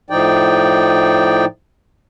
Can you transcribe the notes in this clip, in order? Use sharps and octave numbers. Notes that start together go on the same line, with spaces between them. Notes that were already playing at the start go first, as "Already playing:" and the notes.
A2 F3 D#4 D5 G5